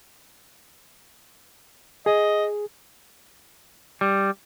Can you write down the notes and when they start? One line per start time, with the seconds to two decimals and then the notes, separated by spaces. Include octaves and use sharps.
2.06 G#4 D#5
4.01 G3